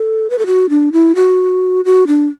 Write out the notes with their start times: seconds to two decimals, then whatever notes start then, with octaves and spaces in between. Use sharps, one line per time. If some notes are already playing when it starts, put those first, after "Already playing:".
Already playing: A4
0.30 B4
0.39 A4
0.46 F#4
0.70 D4
0.92 E4
1.15 F#4
1.85 F#4
2.07 D4